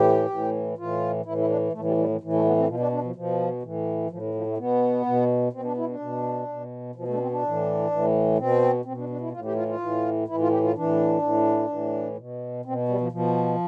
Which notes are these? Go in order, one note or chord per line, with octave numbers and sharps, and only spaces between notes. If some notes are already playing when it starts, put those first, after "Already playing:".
Already playing: A2 E3 G4
A2 E3
A2 E3 F4
A2 E3 E4
E4
D4
A2 A3
E3
G3
G3
E3
A2 E3
A3
B3
C4
B2 F3
D4
D4
F3
B2 F3
A2 E3
A2 E3 F3
E3
F3
A3
B2 B3
B2
B2 C4
D4
E4
D4
B2
B2
B2 F3
A3
D4
C4
D4
A2 E3
A2 E3
B2 C4
B2 C4
D4
D4
E4
A2 F4
E3
G4
F4
F4
A2 E3
A2 E3 E4
F4
G4
F4
A2 E3 D4
A2 E3
A2 E3
B2
B2 C4
G3
F3
B2 F3